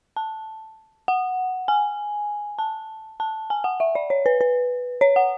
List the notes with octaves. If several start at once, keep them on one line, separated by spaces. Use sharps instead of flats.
A5
F#5
G#5
A5
A5
G#5
F#5
E5
D5
C#5
B4
B4
C#5
F#5